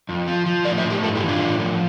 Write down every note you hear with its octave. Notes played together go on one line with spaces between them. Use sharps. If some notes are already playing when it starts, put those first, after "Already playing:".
F2
F3
F3
A2 A#4 D5
C5 E5
A2
G4 A#4
G2 F4 A4
E4 G4
E3
D4 F4
A2
F3